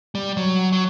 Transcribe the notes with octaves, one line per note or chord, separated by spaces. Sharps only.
G3
F#3
F#3